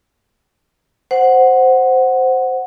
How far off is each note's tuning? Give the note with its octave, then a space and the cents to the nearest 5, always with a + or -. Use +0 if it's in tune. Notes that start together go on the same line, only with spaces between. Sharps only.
C5 +0 F#5 +0